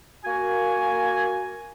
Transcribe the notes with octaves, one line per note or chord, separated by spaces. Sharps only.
A#3 F#4 G#5